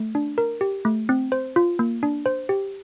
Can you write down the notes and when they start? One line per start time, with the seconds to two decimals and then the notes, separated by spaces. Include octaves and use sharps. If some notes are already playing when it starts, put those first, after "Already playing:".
Already playing: A3
0.15 D4
0.38 A#4
0.61 G4
0.85 A3
1.09 C4
1.32 C5
1.56 F4
1.79 A#3
2.03 D4
2.26 C5
2.49 G4